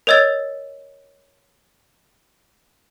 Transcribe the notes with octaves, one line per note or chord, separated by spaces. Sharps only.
A#4 C#5 D#5 E6 A6